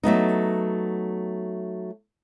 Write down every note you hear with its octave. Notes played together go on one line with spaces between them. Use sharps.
F#3 A3 B3 D#4